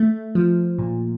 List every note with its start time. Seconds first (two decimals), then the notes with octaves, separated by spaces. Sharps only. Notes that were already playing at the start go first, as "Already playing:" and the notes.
Already playing: A3
0.35 F3
0.78 A#2